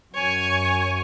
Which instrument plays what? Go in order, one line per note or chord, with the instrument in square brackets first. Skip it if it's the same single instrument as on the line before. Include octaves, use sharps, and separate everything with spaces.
[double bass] F#2 [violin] C#5 G#5